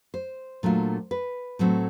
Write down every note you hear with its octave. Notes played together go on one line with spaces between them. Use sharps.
C5
A#2 F#3 A3 D4 F4
B4
A2 F#3 A3 C4